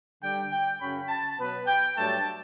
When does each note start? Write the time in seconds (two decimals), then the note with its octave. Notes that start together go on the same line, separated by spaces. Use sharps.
0.21 D3 G3 D4 G5
0.51 G5
0.79 F#2 C#3 F#3 C#4 B5
1.08 A5
1.37 B2 F#3 B3 B4
1.66 G5
1.96 G2 F#3 A3 D4 A5